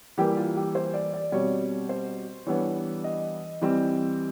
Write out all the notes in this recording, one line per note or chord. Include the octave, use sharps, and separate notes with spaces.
E3 G3 A#3 G4
F4
G4
C5
D5
D5
B2 G3 C4 C#5
C5
E3 G3 B3 D4 C#5
D#5
E3 G3 C4